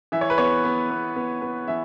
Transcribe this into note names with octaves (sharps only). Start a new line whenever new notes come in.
E3 E5
C#5
B4
B3 C#5
B3
B3
B3
B3
E3 E5